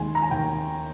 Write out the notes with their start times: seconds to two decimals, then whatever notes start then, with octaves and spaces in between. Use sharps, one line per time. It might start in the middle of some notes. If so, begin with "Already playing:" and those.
Already playing: D#2 G#3 G#5 C6
0.15 A#5
0.22 G#5
0.31 D#2 G5